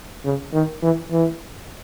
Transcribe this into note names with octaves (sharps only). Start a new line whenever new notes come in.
C#3
D#3
E3
E3